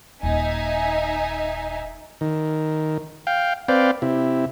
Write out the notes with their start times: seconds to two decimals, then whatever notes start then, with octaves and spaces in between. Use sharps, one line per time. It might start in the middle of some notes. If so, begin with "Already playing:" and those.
0.23 D#1 D#4 E5 G#5
2.21 D#3
3.27 F5 G5
3.68 C4 B4 D5 F5 G5
4.02 C3 E4